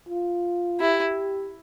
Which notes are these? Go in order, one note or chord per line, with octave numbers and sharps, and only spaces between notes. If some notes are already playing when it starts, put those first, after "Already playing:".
F4
E4 G4